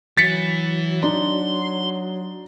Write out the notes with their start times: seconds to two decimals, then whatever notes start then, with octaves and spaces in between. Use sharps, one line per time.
0.17 E3 F#3 A6 B6 C#7
1.03 D4 D#4 C6